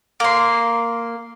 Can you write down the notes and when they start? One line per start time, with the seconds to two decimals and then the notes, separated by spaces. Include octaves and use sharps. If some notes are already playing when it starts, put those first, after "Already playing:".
0.20 A#3 C6